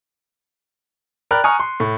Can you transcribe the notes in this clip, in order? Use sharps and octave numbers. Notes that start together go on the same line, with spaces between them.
A#4 D5 G5 B5 F6 F#6
G#5 A#5 C#6 D#6 F6 C#7
C6
A2